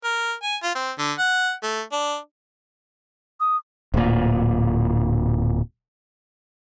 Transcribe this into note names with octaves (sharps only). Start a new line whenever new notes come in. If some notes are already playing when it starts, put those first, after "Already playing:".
A#4
G#5
F4
C4
D3
F#5
A3
D4
D#6
D1 A#2